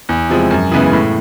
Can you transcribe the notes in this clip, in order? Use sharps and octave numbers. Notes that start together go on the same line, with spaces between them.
E2
C3 F3 G#3
F#2
C#3 E3 G#3 B3
A2